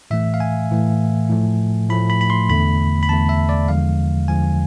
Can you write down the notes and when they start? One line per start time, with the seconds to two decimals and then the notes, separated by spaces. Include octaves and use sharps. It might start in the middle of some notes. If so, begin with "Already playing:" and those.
0.11 A2 E3 A3 E5
0.34 F5
0.40 G#5
0.71 A2 E3 A3
1.30 A2 F3 A3
1.90 A2 F3 A3 B5
2.10 B5
2.21 B5
2.30 C6
2.50 E2 D3 A3 B5
3.03 B5
3.09 E2 D3 A3 A5
3.29 E5
3.49 D5
3.68 E2 D3 F3 G#3 F5
4.28 E2 D3 F3 G#3 G#5